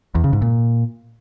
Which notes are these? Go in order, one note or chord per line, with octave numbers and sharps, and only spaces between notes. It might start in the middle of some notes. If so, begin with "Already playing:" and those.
E2
C#3
G#2
A#2